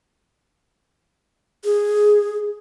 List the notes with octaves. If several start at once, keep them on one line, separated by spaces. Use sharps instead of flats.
G#4